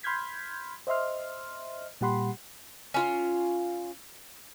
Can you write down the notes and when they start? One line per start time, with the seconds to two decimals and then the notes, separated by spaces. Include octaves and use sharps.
0.03 B5 C6 F6 G6 G#6 B6
0.87 C5 D#5 E5 C6 F6
2.01 A#2 G3 G4 F#5 B5 C6
2.94 C#4 F4 F5